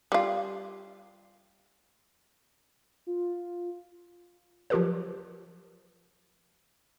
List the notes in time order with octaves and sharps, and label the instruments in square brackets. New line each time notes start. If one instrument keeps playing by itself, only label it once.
[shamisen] G3 F4
[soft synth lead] F4
[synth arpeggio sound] F3 F#3 F4 G4 A#4 B4